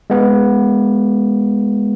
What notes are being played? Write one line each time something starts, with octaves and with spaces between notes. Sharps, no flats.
G#3 B3